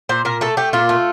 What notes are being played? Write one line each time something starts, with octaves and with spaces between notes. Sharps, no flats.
A#2 C5
A#2 A#4
A3 A4
A3 G4
A#2 F4
A3